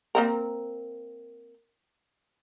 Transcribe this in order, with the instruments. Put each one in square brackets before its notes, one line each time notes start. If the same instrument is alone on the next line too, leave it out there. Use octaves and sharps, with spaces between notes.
[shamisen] A#3 C4 A#4